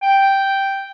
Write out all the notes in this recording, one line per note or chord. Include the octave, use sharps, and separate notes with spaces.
G5